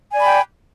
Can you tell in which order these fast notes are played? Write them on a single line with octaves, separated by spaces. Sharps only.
G#5 D5 B5 G5